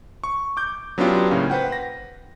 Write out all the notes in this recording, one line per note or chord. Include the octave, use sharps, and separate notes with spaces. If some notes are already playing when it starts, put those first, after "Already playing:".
C#6
D6 G6
F#3 B3 C#4 D4 F4 G4
A2 C#3 A#3 C#4
B4 C5 F#5 G5
A#6